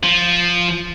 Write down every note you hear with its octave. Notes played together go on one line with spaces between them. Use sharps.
F3